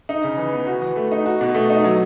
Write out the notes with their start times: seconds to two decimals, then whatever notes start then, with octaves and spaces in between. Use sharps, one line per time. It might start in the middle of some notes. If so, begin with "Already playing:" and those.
0.09 D#4
0.24 C#3
0.38 E3
0.53 B3
0.67 F#4
0.82 E3
0.96 A3
1.12 D#4
1.26 F#4
1.41 B2
1.55 A3
1.70 D#4
1.84 F#3